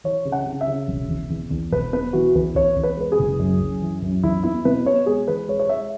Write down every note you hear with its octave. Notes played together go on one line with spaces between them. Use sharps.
E3 C#5
C#3
F#5
C#3
E5
C#3
E1
E2
E2
E2
E1 B4
B3 B4
E3 F#4
E2 B4
E2 C#5
E2
B4
G#3 B4
G#4
F#1
F#2
F#2
E3
F#2
E2 E4
B3 E4
B2 B4
B3 C#5
G#3 G#4
E3 B4
G#3 C#5
C#5
G#3 E5